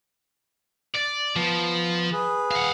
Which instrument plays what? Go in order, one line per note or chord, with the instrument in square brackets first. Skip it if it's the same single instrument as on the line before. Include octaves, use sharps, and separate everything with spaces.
[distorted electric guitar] D5
[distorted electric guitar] F3 [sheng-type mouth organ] B3
[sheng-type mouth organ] G#4 B4
[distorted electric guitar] F5 F#5